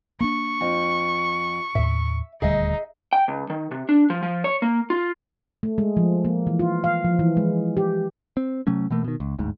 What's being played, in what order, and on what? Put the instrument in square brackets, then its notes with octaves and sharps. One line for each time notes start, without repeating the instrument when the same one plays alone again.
[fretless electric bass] A#3 C4 D4 [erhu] C#6
[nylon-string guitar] F2
[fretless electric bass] D#2 A2 [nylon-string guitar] E5
[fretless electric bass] D#1 D2 G3 [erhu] D#4 [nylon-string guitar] G#4 D#5 E5
[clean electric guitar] G5
C#2
D#3
C3
D4
F3
F3
C#5
A#3
F4
[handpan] A3
G#3
F3
A#3
E3
F4
F5
F3
E3
G#3
G4
[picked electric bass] C4
C3 F#3 A3 C#4
B2 E3 A3 A#3
B2 D#3
C#2
G1 D2 G#2